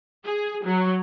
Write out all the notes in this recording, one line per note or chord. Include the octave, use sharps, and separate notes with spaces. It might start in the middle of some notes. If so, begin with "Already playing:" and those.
G#4
F#3